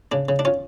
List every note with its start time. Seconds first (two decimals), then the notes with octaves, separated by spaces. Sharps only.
0.12 C#3 D4
0.29 C#3
0.39 D4
0.45 C#4 F4